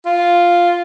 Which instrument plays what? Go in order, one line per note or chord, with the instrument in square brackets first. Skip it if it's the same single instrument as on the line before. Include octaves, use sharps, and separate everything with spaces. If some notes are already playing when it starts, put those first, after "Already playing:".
[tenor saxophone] F4